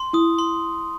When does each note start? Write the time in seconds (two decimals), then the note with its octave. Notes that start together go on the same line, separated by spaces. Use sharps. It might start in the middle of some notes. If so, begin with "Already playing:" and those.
Already playing: C6
0.13 E4 D#6
0.39 C6